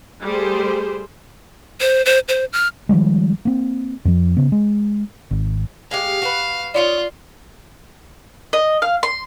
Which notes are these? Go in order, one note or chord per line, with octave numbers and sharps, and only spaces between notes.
G3 A3 G4 G#4 C5
C5
C5
C5
F6
D#3 F3 G3 G#3
A#3 C4
F2 F3
C#3 B3
G#3
G#1
G#3 A3 G4 F5
F#4 A#4 B4
D#4 F4 C#5 D5 F5
D#5
F5
C6